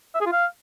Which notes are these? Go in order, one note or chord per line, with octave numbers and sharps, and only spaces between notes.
E5
G#4
F4
F5